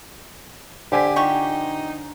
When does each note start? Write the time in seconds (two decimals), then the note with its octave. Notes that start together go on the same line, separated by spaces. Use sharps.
0.92 D3 G4 C5 G#5 B6
1.16 F3 D#4 G4 C#6